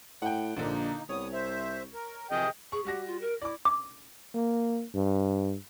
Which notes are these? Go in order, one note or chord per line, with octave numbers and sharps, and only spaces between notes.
A2 F#5 G5
A#1 A#2 D3 A#3 D#4
C2 B3 C#5 D#6
C5 E5
A#4
F2 C3 G#4 D#5 G5
G#4 C#6
G3 F#4 G4 A#6
F4
A#4
E4 D5 D6
D6
A#3
G2